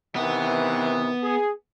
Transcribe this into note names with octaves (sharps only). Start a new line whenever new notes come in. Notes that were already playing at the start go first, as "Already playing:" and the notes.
C3 D#3 E3 B3
G#4